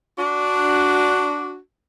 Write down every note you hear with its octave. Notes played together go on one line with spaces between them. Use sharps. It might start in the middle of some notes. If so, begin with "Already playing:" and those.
D4 F#4